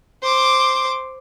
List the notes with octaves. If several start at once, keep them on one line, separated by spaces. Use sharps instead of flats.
C5 D6